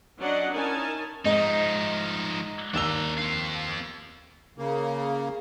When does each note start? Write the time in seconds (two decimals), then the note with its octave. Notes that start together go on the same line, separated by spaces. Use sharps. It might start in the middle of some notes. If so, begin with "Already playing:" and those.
0.20 F#3 C#4 D4 D5 D#5 F#5
0.52 C#4 D#4 E4 A#4 G#5 A5
1.25 G#2 F3 D#4 D#5
2.74 D#2 D4 A#5 E6 G7
3.17 C4 F5
4.58 C#3 A#3